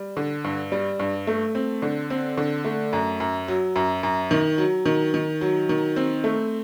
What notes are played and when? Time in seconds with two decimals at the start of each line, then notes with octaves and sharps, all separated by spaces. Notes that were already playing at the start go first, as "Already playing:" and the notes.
Already playing: G3
0.17 D3
0.44 G2
0.72 G3
0.99 G2
1.27 A3
1.55 C4
1.82 D3
2.10 C4
2.37 D3
2.65 A3
2.93 F#2
3.20 F#2
3.48 F#3
3.76 F#2
4.03 F#2
4.31 D#3
4.58 F#3
4.85 D#3
5.14 D#3
5.41 F#3
5.69 D#3
5.96 C4
6.24 A3